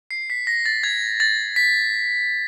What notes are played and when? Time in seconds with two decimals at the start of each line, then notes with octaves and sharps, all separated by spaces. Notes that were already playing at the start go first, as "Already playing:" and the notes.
0.11 C7
0.30 B6
0.47 A#6
0.66 A6
0.83 G#6
1.20 A6
1.56 B6